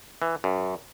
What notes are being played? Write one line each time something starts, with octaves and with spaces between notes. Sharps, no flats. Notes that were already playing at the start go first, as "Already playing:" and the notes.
E3
F#2